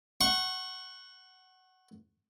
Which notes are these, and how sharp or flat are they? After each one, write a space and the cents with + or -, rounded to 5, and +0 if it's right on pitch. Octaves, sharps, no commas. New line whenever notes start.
F#5 +15 C#6 -30